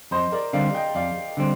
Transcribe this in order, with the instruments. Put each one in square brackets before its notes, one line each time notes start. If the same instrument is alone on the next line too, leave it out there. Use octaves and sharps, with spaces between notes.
[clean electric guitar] F2 [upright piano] C5 D#5
[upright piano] A#4 D5
[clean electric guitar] D3 G3 C4 [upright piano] D5 F5
[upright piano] D#5 G5
[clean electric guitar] F2 [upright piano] D5 F5
[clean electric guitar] D3 G3 C4